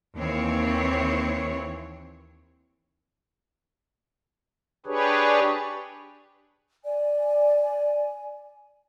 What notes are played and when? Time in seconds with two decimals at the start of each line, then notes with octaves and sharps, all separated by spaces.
0.16 D#2 E3 C4 C#5
4.86 D4 G4 G#4 B4 C#5
6.84 D5 G#5